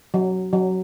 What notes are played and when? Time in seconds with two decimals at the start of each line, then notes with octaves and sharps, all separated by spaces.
0.14 F#3
0.53 F#3